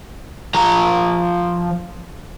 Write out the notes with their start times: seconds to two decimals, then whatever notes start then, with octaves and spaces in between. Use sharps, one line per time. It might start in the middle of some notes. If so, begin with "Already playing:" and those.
0.55 F3 A#5